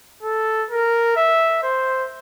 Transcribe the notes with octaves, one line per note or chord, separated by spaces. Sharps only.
A4
A#4
E5
C5